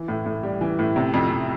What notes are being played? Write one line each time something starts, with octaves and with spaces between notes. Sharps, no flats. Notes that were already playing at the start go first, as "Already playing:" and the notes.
Already playing: E3
A2
A2
G3
E3
A2
C3
F2
F2